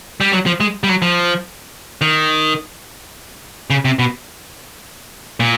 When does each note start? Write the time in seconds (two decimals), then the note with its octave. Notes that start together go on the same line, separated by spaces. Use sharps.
0.21 G3
0.32 F#3
0.46 F3
0.60 G#3
0.84 G3
0.89 F#3
1.02 F3
2.01 D#3
3.70 C#3
3.85 C3
3.99 B2
5.40 A#2